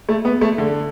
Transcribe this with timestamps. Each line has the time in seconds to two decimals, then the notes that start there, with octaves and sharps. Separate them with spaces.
0.09 A3
0.25 B3
0.41 A3
0.58 D3